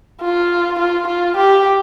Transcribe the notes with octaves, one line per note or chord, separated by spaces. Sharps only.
F4
F4
F4
G4